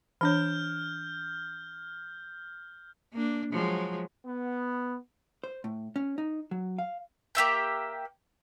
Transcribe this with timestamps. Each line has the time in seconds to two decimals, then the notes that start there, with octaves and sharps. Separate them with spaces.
0.21 E3 D4 C#5 F6 G6
3.13 A#3 D4
3.52 F3 F#3 G#3
4.25 B3
5.44 C5
5.64 A2
5.96 C#4
6.18 D#4
6.51 F#3
6.78 F5
7.35 A#3 G4 E5 G5